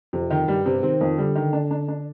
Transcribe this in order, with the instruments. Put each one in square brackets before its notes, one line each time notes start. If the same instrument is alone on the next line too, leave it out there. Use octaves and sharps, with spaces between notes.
[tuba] F2 [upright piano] C3
[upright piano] D#3
[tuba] G2 [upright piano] G3
[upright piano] C3
[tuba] D#3 [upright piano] C4
[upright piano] F2
[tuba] D3 [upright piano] G3
[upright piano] D#3
D4
D4
D4